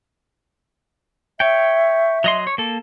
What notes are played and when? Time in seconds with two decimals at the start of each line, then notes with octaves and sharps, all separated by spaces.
1.40 C#5 E5 G5
2.24 F#3 D#5 C6
2.47 C#5
2.58 A#3 A4